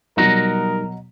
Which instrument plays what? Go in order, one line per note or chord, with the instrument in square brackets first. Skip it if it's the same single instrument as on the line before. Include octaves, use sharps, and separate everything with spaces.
[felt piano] B2 F#3 [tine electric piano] G3 D#4 [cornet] A#4 [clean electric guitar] D#5 F#5 A#5